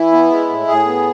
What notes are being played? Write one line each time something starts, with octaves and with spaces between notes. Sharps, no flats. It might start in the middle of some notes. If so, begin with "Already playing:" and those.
Already playing: E3 E4
B3
G#3
A2
A2 G#4
B3